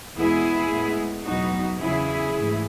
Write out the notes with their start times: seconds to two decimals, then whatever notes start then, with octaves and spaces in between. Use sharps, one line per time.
0.17 E2 B2 G#3 B3 E4 G#4
0.71 A2 G#3 B3
1.26 E2 B2 F#3 B3 D#4 F#4
1.80 E2 C#3 F#3 B3 E4 G#4
2.33 G#2 E3 A3